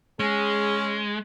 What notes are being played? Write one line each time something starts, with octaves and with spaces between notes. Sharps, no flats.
G#3 C#4 G#4